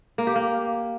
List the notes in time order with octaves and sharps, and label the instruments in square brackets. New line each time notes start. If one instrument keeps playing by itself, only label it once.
[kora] A#3
G4
A#3